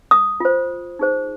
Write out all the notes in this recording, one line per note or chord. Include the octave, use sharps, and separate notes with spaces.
D#6
F4 C5
D#4 G#4 C5